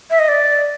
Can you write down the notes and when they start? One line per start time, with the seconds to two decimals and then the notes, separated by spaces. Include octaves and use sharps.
0.11 E5
0.19 D#5
0.28 D5